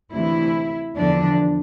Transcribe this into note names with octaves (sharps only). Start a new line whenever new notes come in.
D2 C3 E3 E4
E2 D3 F3 D4